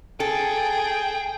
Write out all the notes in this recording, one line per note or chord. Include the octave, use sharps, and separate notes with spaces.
G#4 A4 G5